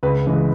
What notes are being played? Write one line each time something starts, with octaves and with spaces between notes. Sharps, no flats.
C#2 B4
C#3 E3 G#3